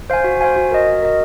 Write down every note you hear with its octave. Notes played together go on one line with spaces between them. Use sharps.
C5 F5 G#5
F#4
C5 F5 G#5
F#4
A#4 D#5
F#4
A#4 D#5